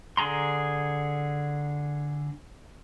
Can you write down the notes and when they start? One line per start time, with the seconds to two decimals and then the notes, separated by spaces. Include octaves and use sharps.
0.17 D3 G#4 A#5 C6